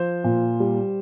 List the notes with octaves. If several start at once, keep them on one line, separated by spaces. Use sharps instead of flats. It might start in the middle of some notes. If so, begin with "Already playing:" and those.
Already playing: F3 C5
A#2
G3